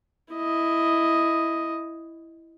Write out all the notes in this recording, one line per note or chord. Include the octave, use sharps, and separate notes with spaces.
E4 D#5